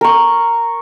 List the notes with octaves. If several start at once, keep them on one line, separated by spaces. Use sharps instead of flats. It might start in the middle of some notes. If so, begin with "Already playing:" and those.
A#4 C#6